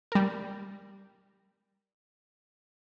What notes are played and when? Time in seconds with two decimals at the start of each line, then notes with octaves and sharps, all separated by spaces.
0.12 G3 A#4